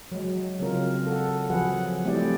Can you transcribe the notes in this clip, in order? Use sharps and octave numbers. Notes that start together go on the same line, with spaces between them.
F#3 G#3
C#3 F#3 G#3 C4 F4 A#4
A4 F#5
F3 F#3 F#4 G#4 B4 F#5
G3 A3 C4 E4 G4 D5